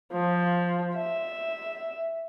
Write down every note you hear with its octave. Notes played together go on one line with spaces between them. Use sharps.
F3
E5